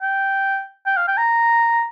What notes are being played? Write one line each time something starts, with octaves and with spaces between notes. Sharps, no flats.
G5
G5
F5
G5
A#5